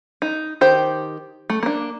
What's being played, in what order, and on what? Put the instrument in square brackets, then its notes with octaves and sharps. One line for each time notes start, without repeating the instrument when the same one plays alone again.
[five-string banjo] D#4
D#3 G4 C5
A3
A#3 D4